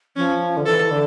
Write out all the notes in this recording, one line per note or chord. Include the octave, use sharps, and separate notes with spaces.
F3 C#4
D3
E3 A4
D3